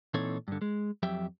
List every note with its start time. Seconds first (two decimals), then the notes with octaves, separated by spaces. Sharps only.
0.14 A#2 E3 C4 D#4 A4 C#5
0.48 G2 D3
0.62 G#3
1.03 F2 F#3 G4 E5 G5